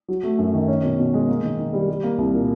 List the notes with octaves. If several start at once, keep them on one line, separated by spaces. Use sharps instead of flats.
F#3
A3
F#2
D#3
C#4
B2
B2
G#3
A#3
D#3
D#3
G3
G3
A#3
C2
A#2